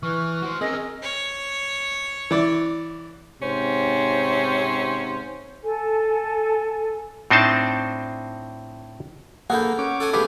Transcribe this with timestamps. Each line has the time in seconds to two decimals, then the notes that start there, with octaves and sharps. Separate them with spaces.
0.03 E3 B4 C#6 F6
0.42 F#4 C5
0.61 C4 C#4 G#4 A#4 D#5 E6 F6
1.02 C#5
2.31 E3 D5
3.41 G#2 C3 C#4 C5
5.62 A4 G#5
7.30 A2 C4 D4 D#4 C5 A5
9.50 A#3 G#4 A4 B4 F#5 G6
9.79 C#4 D6
10.00 A4 F#5 G#5
10.13 A3 B3 G4 G#4 B4 F5 D6